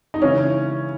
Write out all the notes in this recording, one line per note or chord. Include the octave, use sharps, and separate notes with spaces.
D#4
C#3 E3 C#4